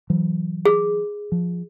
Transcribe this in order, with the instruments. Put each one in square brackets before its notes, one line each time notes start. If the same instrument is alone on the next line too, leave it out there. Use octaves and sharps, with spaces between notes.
[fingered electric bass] E3 F#3
[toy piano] G#4
[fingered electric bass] F3